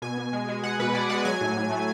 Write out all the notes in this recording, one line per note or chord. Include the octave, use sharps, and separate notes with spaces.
B2 G#5
B2
G#3
G#3
G#3 F#5
B2 B4
G#3 D5
G#3 F#5
F#3 G#5
A2
A2
A3